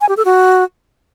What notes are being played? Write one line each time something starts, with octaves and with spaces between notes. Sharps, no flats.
G#5
G4
A4
F#4